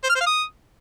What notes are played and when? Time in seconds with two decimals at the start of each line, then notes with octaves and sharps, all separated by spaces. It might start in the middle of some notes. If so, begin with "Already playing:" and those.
0.04 C5
0.09 F6
0.15 C5
0.21 F5
0.27 D#6